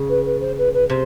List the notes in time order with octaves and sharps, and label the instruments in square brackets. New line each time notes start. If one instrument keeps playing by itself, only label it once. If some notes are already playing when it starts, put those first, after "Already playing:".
Already playing: [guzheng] C#3
[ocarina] B4
B4
C5
B4
B4
[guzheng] C3 [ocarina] C5